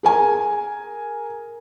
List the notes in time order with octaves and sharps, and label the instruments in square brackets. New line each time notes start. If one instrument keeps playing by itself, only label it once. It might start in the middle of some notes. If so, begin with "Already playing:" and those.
[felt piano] G#4 A#4 G#5